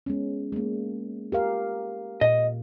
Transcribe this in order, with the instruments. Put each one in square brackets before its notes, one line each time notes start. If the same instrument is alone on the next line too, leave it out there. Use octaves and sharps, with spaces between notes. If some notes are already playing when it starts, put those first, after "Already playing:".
[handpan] G#3 B3 C#4
G#3 A#3
G4 A#4 F5
[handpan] A#2 [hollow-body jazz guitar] D#5